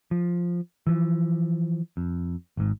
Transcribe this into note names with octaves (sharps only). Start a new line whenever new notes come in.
F3
E3 F3
F2
G#1 G#2